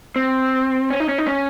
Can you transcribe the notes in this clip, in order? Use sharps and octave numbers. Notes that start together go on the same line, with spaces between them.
C4
C#4
D#4
C#4
D#4
C#4